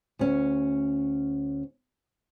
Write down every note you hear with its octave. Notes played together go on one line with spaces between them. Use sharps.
D2 C#4